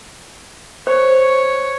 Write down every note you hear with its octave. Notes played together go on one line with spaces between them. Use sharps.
C5 C#5